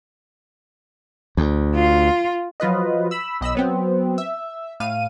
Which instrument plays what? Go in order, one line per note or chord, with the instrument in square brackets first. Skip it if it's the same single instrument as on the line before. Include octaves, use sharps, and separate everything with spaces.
[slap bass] D2
[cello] F4
[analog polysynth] F3 F#3 F4 B4 D#5
B5 E6
B1 D#5 B5 E6
F#3 B3 C4
E5
A2 F5 D#7